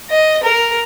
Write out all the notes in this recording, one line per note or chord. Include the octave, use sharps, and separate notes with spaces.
D#5
A#4